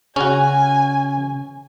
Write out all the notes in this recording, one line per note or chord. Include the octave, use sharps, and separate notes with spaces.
C#3 C#4 F#4 G#5